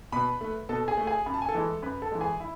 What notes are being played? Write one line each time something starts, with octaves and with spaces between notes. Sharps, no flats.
B2 B4 B5
A3
B2 A4 A5
G#4 G#5
A3
G#4 G#5
F#2 B5
A5
G#5
A4 A5
E3 G#3
F#2 B4 B5
A4 A5
E3 G#3
G#4 G#5
E4 E5